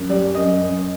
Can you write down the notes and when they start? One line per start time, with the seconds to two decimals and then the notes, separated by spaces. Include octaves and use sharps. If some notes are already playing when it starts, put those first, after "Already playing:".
Already playing: F#2
0.09 G3 D5
0.35 F#2 D#5
0.61 F#2